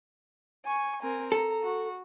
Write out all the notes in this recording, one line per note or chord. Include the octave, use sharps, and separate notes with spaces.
G#5 C#6
C4 A#4 G#5
A4 A#5
F#4